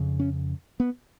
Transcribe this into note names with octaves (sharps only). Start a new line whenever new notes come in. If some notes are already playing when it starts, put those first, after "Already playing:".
Already playing: F2 C#3
C#4
B3